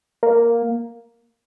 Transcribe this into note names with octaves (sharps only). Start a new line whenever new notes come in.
A#3